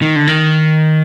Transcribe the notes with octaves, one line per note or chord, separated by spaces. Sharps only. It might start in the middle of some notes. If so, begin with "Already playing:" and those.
D#3
D3
D#3